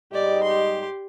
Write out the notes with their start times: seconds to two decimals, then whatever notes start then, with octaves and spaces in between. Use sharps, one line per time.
0.12 G#2 G3 G4 D5 D#5
0.44 G4 C6